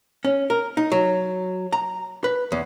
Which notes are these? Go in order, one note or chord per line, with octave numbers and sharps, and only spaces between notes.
C#4
A#4
D#4
F#3
A#5
B4
E2